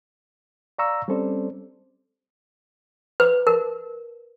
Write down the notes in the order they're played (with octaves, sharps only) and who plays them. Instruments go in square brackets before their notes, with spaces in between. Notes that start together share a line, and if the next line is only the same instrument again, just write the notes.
[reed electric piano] D5 F5 A#5 C#6 E6
G3 C4 C#4 A4 C5 D5
[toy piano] B4
A#4